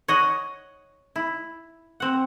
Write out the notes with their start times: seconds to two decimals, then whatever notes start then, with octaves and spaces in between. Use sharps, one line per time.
0.08 C#5 D#5 F#5
1.16 E4
2.00 C4 F#5